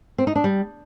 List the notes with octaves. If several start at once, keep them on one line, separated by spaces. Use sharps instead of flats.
C4
D#4
D4
G3